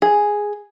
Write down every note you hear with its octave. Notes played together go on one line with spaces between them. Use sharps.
G#4